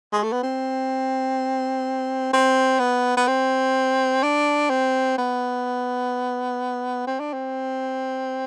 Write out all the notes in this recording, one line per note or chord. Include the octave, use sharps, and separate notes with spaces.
G#3
A3
B3
C4
C4
B3
B3
C4
D4
C4
B3
C4
D4
C4